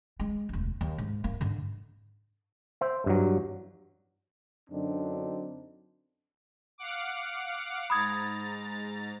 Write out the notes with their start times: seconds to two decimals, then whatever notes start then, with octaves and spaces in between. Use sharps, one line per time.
0.20 G#3
0.49 E1 D2
0.81 D#2
0.98 G#2
1.24 A#3
1.41 G#2 D3
2.81 C5 E5
3.06 G2 F#3
4.70 F#2 D3 F#3 C4 D4 D#4
6.78 F5 F#5 D6
7.90 G#2 A#5 B5 D#6 G#6 A6